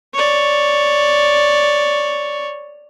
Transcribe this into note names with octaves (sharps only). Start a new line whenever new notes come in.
C#5 D5